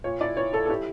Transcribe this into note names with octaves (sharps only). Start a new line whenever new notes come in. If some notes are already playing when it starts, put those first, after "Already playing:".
A#2 C#5
E4 D5
E4 C#5
E4 A4
A4
E4 G4